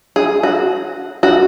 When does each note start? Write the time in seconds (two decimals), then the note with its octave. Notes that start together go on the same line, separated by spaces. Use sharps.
0.16 G#4
0.43 F#4
1.23 F#4